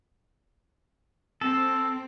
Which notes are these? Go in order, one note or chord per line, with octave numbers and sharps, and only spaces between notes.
C4 A4